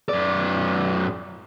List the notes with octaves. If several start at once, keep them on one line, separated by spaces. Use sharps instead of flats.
F#2 D5